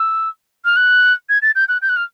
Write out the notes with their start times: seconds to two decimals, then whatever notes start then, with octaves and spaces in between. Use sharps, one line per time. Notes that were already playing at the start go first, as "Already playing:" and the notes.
Already playing: E6
0.65 F6
0.76 F#6
1.29 G#6
1.42 A6
1.55 G6
1.68 F#6
1.82 G6
1.89 F#6
1.96 F6